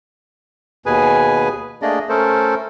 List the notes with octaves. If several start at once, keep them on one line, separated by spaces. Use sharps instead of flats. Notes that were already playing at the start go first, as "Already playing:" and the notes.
D#2 B2 G#4 B4 G#5
A3 A#3 D4 G#4 D5 D#5
A3 C#4 A4 A#4 C5